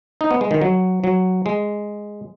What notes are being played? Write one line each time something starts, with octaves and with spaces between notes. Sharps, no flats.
D#4
B3
G#3
D#3
F#3
F#3
G#3